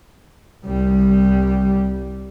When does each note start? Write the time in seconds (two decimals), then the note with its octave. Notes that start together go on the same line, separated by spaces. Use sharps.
0.65 C2 G3